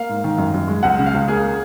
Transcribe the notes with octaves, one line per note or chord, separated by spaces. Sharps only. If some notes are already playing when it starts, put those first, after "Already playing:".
Already playing: A#3 F5
G#2
D#3
F#2
F#2
G#3
C#2 F#5
C#3
F5
C#2
A#3 G#4